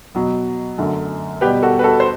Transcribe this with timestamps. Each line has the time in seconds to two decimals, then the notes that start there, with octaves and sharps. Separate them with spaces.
0.15 B2 F#3 B3
0.78 F#2 D3 A3
1.41 B2 G3 B3 G4 B4
1.62 F#4 A4
1.79 B4
1.83 F#4 A4
2.00 C5